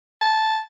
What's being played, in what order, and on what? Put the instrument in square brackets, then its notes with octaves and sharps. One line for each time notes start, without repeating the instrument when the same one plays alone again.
[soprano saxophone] A5